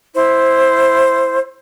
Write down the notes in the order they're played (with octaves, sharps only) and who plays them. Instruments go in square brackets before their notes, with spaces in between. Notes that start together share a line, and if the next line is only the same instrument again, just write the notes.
[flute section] E4 C5